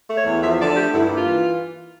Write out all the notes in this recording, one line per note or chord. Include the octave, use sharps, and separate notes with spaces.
A3
C#5
E2
F3 E5
D3 D5
A3 G4
G2 E4
A#3
F4
E3